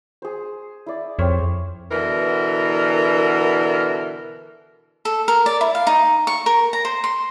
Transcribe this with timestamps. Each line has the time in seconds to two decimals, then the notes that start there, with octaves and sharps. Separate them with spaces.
0.22 G#4 C5
0.86 E4 D5
1.19 F2 C4 C5 C#5
1.91 B2 D3 E3 A#4
5.05 A4
5.28 A#4
5.46 D5
5.61 E4
5.75 F5
5.87 D#4
6.27 C#6
6.46 A#4
6.73 A#5
6.85 C5
7.04 C6